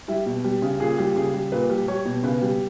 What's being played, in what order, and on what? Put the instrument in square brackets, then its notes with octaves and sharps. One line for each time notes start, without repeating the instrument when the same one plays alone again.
[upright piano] G3 E4
B2
G3
C#3
A#2 G#4
G3
C#3 G#4
G3
A#2 B4
G3
G3 C#5
B2
C#3 B4
G3